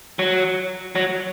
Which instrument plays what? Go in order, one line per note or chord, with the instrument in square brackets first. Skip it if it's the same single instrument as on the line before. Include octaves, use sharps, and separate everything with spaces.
[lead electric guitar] F#3
F#3